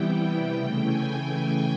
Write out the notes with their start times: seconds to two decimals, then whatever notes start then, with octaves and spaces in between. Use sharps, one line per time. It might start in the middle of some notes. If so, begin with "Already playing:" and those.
Already playing: C3 E3 G3 B3 E4 G5
0.19 G5
0.53 C#3 E3 A3
0.86 G#5